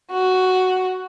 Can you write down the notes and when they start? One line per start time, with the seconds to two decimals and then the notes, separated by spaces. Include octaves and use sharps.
0.11 F#4